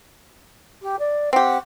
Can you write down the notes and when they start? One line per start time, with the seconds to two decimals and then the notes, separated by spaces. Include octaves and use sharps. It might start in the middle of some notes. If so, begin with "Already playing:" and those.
0.82 G4
0.99 D5
1.33 C4 G4 F#5